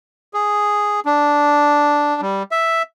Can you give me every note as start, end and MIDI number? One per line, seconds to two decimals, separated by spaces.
0.34 1.00 68
1.05 2.21 62
2.21 2.43 55
2.51 2.82 76